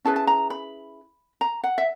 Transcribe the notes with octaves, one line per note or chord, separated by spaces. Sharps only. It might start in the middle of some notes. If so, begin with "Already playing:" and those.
C#4 E4 G#4 B4 A5
A5
A#5
B5
A#5
F#5
E5